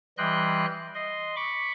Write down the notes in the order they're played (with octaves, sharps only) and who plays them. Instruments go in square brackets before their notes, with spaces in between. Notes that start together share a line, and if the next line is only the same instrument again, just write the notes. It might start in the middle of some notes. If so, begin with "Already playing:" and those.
[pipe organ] E3 G3 D#5 G5 C6 F#6
D#5 C6
B5 C#6 D6